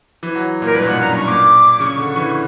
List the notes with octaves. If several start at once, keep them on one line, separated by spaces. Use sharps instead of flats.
E3
F#3
A#2 A#4
G2 B4
B2
A#2 F#5
F#2 A#5
G2 C#6
A#2 D6
C#3 C#6
D3
E3